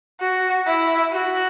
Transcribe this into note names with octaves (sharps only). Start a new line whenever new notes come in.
F#4
E4
F#4